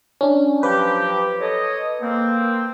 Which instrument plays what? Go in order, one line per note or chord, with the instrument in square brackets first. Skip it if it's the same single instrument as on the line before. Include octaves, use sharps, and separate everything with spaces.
[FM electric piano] C#4 D4
[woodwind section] F3 F#3 G4 [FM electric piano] B4
[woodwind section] A4 C#5 D#5
A#3 C4